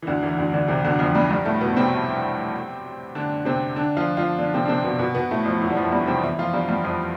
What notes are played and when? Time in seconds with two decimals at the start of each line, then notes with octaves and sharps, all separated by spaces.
0.02 E3
0.07 D2 D3
0.23 E2 E3
0.38 D2 D3
0.53 D2 D3
0.68 C2 C3
0.84 D2 D3
0.99 F2 F3
1.15 G2 G3
1.30 G2 G3
1.46 A2 A3
1.61 B2 B3
1.77 C3 C4
3.15 D3 D4
3.45 C3 C4
3.76 D3 D4
3.97 F3 F4
4.17 F3 F4
4.39 D3 D4
4.54 C3 C4
4.65 D4
4.68 C3 C4
4.84 B2 B3
4.99 B2 B3
5.15 B2 B3
5.31 A2 A3
5.46 F2 F3
5.61 E2 E3
5.70 G3
5.76 F2 F3
5.92 G2 G3
6.07 C3 C4
6.23 E3 E4
6.39 F3 F4
6.53 G2 G3
6.69 G2 G3
6.84 F2 F3